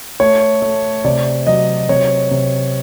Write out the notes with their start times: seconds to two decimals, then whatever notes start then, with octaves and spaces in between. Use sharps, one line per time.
0.20 A3 C#5
0.62 A3
1.04 C3 D5
1.47 F#3 D#5
1.89 C3 C#5
2.31 C3